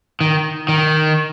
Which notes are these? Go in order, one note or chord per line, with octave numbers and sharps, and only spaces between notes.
D#3
D#3